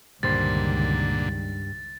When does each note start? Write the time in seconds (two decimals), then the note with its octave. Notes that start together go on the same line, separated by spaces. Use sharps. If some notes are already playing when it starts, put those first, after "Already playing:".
0.23 C#2 G2 A#2 D3 D#3 G3 C5 A6